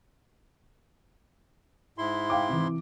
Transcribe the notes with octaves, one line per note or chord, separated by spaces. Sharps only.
G#2 E4 C6
F5 G5 D6
C3 E3